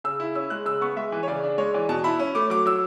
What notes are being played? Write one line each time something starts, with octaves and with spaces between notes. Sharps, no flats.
C#3 E6
E4
C#4 E6
G#3 F#6
C#3 E6
B3 C#6
G#3 E5
E3
C#5
C#3 D5
D4
G#3 C#5
E3 D5
B2 A5
E4 B5
C#4
A3 D6
F#3 D6
F#3 E6